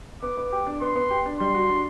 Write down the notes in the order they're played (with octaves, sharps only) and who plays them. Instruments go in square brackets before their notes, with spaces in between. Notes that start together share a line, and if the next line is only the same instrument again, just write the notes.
[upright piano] B3 [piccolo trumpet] D6
[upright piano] B3
[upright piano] G4 [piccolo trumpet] D6
[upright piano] D4
[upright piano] B3 [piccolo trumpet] C6
[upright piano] B3
G4
D4
[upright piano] G3 [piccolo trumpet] C6
[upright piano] F#4
D4